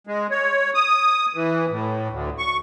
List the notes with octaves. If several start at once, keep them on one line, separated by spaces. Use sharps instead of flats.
G#3
C#5
D#6
E3
A2
D2
C#6